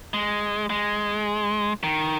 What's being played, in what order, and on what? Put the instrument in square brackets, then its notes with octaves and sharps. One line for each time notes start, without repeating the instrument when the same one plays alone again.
[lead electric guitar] G#3
G#3
D#3